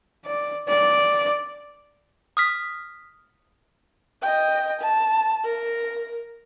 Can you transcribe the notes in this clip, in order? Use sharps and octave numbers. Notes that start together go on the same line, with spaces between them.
D5
D5
D#6 F6 B6
D#5 G5
A5
A#4